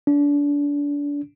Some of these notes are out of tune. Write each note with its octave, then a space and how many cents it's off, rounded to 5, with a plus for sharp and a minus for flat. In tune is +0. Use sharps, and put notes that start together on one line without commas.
D4 -30